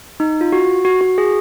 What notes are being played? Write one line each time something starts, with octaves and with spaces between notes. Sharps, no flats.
D#4
F4
F#4
F#4
F#4
G#4